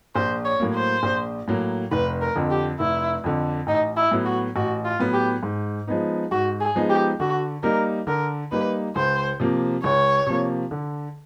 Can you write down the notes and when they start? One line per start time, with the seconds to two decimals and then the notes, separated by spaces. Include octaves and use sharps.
0.15 A#1 C5
0.45 C#5
0.60 A2 F#3 A#3
0.75 C5
1.03 A#1
1.48 A2 F#3 A#3
1.91 F1 B4
2.21 A#4
2.36 F2 D3
2.50 G4
2.79 F1 E4
3.24 F2 D3
3.67 A1 D#4
3.96 E4
4.11 A2 F#3 B3
4.25 F#4
4.56 A1 F#4
4.84 F4
5.00 A2 F#3 B3
5.13 G4
5.43 G#2
5.87 F3 G#3 B3 D#4
6.31 G#2 F#4
6.60 G#4
6.75 F3 G#3 B3 D#4
6.89 G4
7.20 D3 F#4
7.63 G3 A#3 D#4 A#4
8.07 D3 A#4
8.51 G3 A#3 D#4 B4
8.95 C#2 C5
9.40 C3 F3 A#3
9.83 C#2 C#5
10.26 C3 F3 A#3
10.71 D3